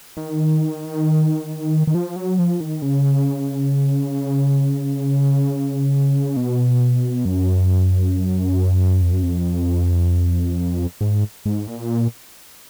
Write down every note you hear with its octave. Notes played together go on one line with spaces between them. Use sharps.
D#3
D#3
F3
F#3
F3
D#3
C#3
B2
F#2
F2
F#2
F2
G#2
G#2
A#2